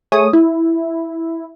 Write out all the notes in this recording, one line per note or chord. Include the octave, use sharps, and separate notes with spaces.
A3 G#4 C#5 D#6
E4